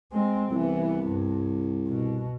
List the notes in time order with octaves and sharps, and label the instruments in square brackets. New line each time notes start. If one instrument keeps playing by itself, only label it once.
[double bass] G#3 C4
[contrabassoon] C2 [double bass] E3 B3
[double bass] G2
B2